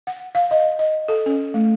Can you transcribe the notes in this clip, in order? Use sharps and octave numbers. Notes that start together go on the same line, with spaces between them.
F#5
F5
D#5
D#5
A4
C#4
A3